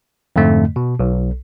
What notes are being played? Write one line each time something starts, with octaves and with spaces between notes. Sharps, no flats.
F2 G#2 D3 A3
B2
B1